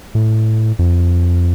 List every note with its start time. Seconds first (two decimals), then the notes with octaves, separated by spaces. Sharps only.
0.15 A2
0.79 F2